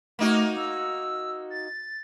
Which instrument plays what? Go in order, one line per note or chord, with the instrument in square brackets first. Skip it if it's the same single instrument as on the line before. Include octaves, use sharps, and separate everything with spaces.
[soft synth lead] A3 [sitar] A#3 D#4 F#4
[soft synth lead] E6
A6